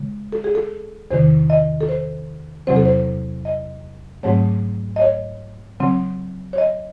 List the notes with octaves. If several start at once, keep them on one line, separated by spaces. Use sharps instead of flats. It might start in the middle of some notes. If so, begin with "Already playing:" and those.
Already playing: C#3 G#3
A4
G#4
A4
E2 C3 D#3 C5
D#5
A4
C5
E2 C3 F#3 C4 C5
A4
C5
D#5
G#2 F#3 A3 C4 C#5
D#5
C#5
C#3 F#3 C4
C#5
D#5